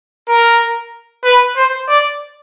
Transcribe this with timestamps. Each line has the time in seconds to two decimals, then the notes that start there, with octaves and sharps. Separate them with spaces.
0.29 A#4
1.24 B4
1.57 C5
1.89 D5